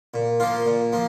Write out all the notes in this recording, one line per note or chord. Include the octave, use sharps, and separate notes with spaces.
A#2
F3 A#3 F4
A#2
F3 A#3